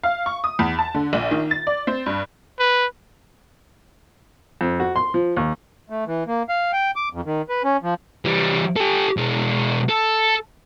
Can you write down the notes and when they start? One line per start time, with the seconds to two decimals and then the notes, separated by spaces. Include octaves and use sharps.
0.03 F5
0.26 C#6
0.44 D#6
0.59 E2
0.79 A5
0.94 D3
1.13 A#1
1.31 D#3
1.51 A6
1.67 D5
1.87 C4
2.06 G2
2.59 B4
4.61 F2
4.80 F#4
4.96 C6
5.14 F3
5.37 D#2
5.90 A3
6.07 E3
6.27 A#3
6.49 F5
6.73 G5
6.96 D6
7.13 F2
7.26 D#3
7.49 B4
7.64 C#4
7.83 F3
8.25 E3 G3
8.76 G4 A4
9.17 B2 G#3
9.89 A4